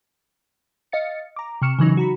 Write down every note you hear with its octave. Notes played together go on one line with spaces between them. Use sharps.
D#5 F5 A6 C#7
A#5 D6
C3 C#6 F6 C#7 E7
C#3 E3 F#3 D#4
F#4 A#5 B5